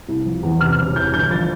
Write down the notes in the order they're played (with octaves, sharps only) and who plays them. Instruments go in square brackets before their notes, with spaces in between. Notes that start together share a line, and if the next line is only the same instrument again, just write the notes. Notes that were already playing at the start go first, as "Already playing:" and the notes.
[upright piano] C2
F3
E2
C3 F6
E1
E3 G6
G1 G6
F3 A6